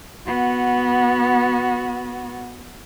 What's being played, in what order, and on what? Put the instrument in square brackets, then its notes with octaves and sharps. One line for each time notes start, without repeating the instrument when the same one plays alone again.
[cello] B3 F#4